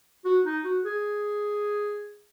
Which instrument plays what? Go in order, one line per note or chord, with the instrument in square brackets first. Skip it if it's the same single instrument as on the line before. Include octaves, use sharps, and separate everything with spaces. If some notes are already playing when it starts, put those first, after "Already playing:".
[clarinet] F#4
D#4
F#4
G#4